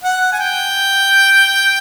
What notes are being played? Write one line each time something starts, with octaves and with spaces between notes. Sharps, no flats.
F#5
G#5
G5